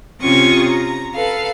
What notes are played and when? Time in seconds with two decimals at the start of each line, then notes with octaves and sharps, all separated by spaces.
0.22 C3 C#4 F4 C#6 D#6
0.68 A#5
1.14 A4 B4 F5